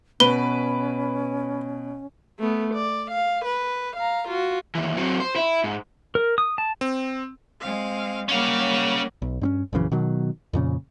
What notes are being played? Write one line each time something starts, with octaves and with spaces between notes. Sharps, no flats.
B2 C#4 B4 G7
A3 B3
D5
F5
B4
F5 A#5
F4 F#4
D#2 E3
F#3 C4
C5
E4
G#2
A#4
D#6
A5
C4
G#3 C4 F5
F#3 G3 A#3 C#4 F5
B1
G2 C4 C#4
A#1 F#2 C#3 E3
B2 D#3 F#3
F2 A#2 C#3